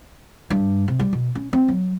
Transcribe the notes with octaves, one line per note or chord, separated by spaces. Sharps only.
G2
C3
G3
B2
C#4
C4
F#3